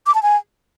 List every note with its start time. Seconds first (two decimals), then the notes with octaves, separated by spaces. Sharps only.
0.07 D6
0.15 A5
0.23 G#5